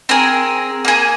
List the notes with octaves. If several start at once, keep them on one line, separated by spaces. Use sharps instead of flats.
C4 G#4 A#4
A#3 G#4